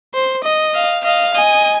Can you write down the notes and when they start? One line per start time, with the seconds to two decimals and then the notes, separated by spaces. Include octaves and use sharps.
0.14 C5
0.44 D#5
0.75 F5
1.04 D#5 F5
1.34 D#5 G#5